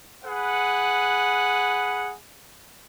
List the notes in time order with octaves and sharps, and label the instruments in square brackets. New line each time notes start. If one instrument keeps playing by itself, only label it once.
[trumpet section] G#4 B4 F#5